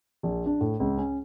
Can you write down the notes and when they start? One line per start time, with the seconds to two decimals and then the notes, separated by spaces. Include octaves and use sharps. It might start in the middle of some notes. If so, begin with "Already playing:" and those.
0.23 A#1
0.46 D4
0.61 A2
0.80 C#2
0.98 C#4